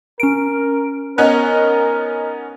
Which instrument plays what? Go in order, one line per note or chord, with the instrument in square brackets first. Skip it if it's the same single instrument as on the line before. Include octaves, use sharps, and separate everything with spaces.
[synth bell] C#4 D7 [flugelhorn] A#4
[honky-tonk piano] B3 C#4 D#4 [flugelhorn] A#4 [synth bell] F#6